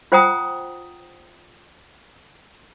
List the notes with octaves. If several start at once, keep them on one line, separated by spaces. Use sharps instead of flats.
F4 C5 F#5 G5 A#5 D#6